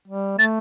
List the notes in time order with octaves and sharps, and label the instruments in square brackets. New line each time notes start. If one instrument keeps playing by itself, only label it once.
[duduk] G3
[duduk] A3 [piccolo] A6